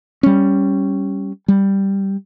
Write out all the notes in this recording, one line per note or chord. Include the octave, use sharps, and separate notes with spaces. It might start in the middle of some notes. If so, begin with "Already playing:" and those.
G3 C#4
G3